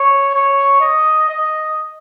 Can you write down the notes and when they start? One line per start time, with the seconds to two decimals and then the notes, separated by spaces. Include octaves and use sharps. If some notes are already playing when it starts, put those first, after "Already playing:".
Already playing: C#5
0.34 C#5
0.81 D#5
1.29 D#5